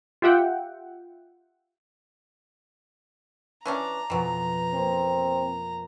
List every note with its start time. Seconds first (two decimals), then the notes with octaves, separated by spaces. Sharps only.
0.22 F4 G4 E5 F#5 G5
3.66 E3 C#4 D4 D5 A#5
4.10 F2 B2 E3 F#3
4.73 A#3 C4